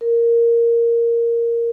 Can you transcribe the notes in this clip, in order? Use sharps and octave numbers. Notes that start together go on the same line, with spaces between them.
A#4